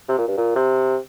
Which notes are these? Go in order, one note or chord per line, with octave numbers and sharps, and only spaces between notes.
C3
A#2
G2
A#2
C3